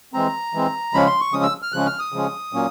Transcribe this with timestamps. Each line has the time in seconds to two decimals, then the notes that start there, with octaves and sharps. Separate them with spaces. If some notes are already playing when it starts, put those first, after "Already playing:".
0.13 E3 G#3 C4 A#5
0.54 E3 G#3 C4
0.94 C#3 F3 G#3 C#4 B5
1.07 C6
1.20 C#6
1.33 C#3 F3 G#3 C#4 D#6
1.43 E6
1.62 F6
1.72 C#3 F3 G#3 C#4 F#6
1.86 F6
1.99 D#6
2.12 C#3 F3 G#3 C#4
2.53 A#2 F#3 A#3 C#4